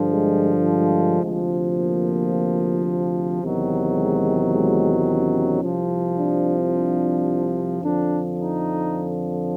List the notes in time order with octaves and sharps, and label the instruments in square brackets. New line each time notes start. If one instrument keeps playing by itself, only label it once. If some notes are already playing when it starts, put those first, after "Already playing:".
Already playing: [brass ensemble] G2 D3 F3
G#3
G#3
D2 C3 F3
A#3
E2 C3 D#3 F#3
G#3
G#3
C#4
C2 C3 F3
D4
D4
F2 D3 F3 D4
D#4